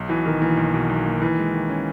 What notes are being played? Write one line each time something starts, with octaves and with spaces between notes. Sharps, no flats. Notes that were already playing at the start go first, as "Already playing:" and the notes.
Already playing: B1
B2 E3
B1 D#3
E3 A#3
B1
B2
B1
A#3
D#3 E3
G#3
D#3
C#4